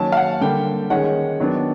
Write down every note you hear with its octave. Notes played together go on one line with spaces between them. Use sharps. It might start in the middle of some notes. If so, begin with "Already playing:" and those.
Already playing: D#3 F#3 A#3 C#4 A5
F5
F#5
D3 G3 A#3 G5
D#3 G#3 C#4 F#5
D#3 F#3 B3 D4